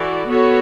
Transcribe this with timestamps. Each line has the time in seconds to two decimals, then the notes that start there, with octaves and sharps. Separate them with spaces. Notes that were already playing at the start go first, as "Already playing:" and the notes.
Already playing: E3 F#4 A4 D5
0.27 B3 F#4 A4 C#5